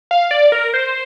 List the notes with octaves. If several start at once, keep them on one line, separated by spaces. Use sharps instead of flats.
F5
D5
A#4
C5